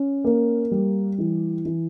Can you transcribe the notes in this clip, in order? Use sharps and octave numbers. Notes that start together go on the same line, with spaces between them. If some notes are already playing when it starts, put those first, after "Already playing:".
Already playing: C#4
A#3
G3
E3
E3